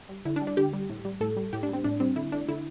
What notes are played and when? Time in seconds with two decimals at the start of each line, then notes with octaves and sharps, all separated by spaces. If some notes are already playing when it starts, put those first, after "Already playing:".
0.09 G3
0.25 D3 E4
0.36 D4
0.41 G3
0.47 D4
0.57 D3 G4
0.73 G3
0.90 A2
1.05 G3
1.21 A2 A4
1.37 G3
1.53 A2 G4
1.63 D4
1.69 G3 C4
1.84 A2 D4
2.00 G3 C4
2.16 D3 E4
2.32 A3 D4
2.49 D3 E4